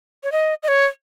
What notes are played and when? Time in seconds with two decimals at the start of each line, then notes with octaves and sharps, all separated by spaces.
0.23 C#5
0.32 D#5
0.63 D#5
0.68 C#5